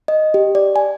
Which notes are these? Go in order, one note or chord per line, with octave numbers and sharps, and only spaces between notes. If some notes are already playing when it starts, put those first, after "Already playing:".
D#5
G4
D5
G#5